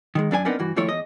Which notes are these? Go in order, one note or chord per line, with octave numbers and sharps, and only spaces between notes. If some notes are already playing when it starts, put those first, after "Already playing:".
D#3 F3 G#3
F#2 D4 A4 G#5
B3 C4 D4 D#4 A#4 F#5
G2 E3 F#4
D#2 F3 A3 E4 C#5
E2 D#5